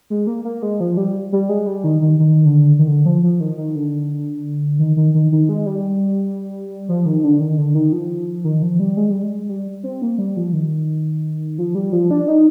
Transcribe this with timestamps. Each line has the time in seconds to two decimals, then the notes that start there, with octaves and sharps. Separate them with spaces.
0.10 G#3
0.27 A#3
0.44 A#3
0.62 G#3
0.80 F3
0.97 G3
1.32 G3
1.49 G#3
1.67 G3
1.84 D#3
2.02 D#3
2.19 D#3
2.45 D3
2.79 D#3
2.88 D3
3.06 F3
3.23 F3
3.40 D#3
3.57 D#3
3.76 D3
4.79 D#3
4.97 D#3
5.14 D#3
5.32 D#3
5.49 G#3
5.66 G3
6.89 F3
7.06 D#3
7.24 D3
7.40 D#3
7.58 D3
7.75 D#3
7.92 F3
8.44 D#3
8.62 F3
8.80 G3
8.97 G#3
9.10 G3
9.23 G#3
9.49 G3
9.83 C4
10.02 A#3
10.18 G3
10.37 F3
10.53 D#3
11.58 F3
11.75 G3
11.92 F3
12.11 D4
12.28 D#4